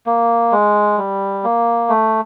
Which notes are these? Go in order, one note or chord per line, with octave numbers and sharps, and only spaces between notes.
A#3
G#3
G3
A#3
A3